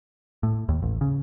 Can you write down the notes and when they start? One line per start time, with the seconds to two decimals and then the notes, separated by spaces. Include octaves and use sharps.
0.43 A2
0.69 D#2
0.82 A1
1.01 C#3